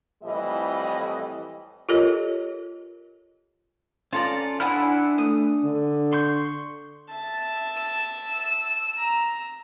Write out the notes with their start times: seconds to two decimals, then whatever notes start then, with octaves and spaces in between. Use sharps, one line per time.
0.23 F2 A2 E3 G3 D#5
1.89 F4 G4 A4 A#4 C#5 D#5
4.13 C#4 F4 A4 D5 A#5
4.60 D4 E4 F#5 G#5 F6
5.18 A3 D#6
5.63 D3
6.13 C6 C#6 G6
7.10 E5 A5
7.77 E6
8.98 A#5